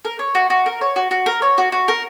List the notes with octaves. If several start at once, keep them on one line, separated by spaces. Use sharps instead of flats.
A#4
C#5
F#4
F#4
A#4
C#5
F#4
F#4
A#4
C#5
F#4
F#4
A#4